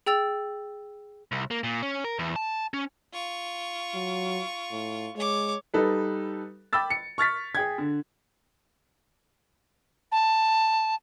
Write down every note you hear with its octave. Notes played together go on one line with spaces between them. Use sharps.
G#4 G5 E6 A6 F7
C2
A#3
A#2
C#4
A#4
E2
A5
C#4
F4 C#6
F#3
A2
G#3 C#5 D6
G3 D#4 A4 B4
G5 B5 D6 E6 A6
C#7
C#6 F6 A6 B6
G#4 G5 G#6
D3
A5